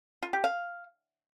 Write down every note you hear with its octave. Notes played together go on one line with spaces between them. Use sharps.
F4
G4
F5